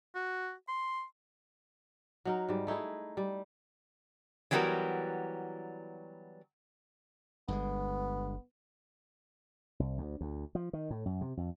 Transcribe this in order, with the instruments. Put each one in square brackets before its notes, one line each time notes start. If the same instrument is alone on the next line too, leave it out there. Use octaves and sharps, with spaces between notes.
[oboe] F#4
C6
[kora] F#3 D#4 A#4
G#2 G3
A3 D#4 E4 G#4
G3
[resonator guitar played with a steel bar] E3 F#3 G3 B3 F#4 A#4
[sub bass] G1 [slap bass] G2 D3 G#3 [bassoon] B3
[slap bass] C2
D2
D2
F3
D#3
A2
F#2
C3
F2